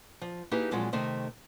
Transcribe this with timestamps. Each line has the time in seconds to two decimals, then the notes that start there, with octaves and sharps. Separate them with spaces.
0.21 F3
0.51 A#3 D#4 E4 G4 G#4 B4
0.71 A#2 F3 F#3 G#3 C4
0.93 C3 D#3 A3 C5 D#5